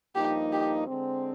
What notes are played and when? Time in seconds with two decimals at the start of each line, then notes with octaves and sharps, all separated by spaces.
0.15 G2 F3 A#3 D#4 G4
0.52 G4
0.87 D3 G#3 C4